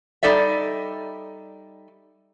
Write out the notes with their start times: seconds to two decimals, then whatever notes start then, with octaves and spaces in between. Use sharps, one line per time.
0.23 G3 D#4 A4 D5 E5